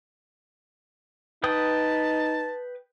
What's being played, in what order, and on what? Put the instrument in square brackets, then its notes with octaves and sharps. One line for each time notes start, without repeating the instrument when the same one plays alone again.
[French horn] D#4 [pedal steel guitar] B4 G5 D#6 [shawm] A5